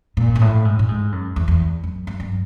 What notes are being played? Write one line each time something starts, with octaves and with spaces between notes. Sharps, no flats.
A#2
G#2
A2
G#2
A2
G#2
F#2
E2
E2
F#2
G2
F#2